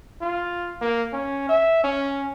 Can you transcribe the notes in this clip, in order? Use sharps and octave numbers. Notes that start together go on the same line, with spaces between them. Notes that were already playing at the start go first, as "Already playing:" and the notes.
F4
A#3
C#4
E5
C#4